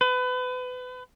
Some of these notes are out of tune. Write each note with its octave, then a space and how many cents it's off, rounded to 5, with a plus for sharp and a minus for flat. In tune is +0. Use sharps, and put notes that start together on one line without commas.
B4 +30